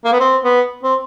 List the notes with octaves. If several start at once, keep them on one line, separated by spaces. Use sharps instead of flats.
A#3
B3
C4
B3
C4